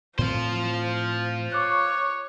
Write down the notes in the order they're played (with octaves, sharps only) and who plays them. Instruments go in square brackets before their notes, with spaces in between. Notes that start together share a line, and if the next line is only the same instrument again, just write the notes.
[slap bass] A2 C4 [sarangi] F3 [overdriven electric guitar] F4 C5
[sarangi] C#5 [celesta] C#6 D6 F#6